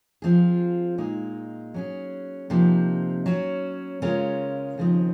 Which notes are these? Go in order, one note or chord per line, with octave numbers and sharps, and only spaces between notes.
F3 C4 F4 G#4
A#2 G#3 D#4
F#3 C#4 G#4
C3 F3 A#3 D#4
F#3 C#4 F#4
C#3 G#3 C#4 F4 A#4
D#2 C#3 F3 C4 D#4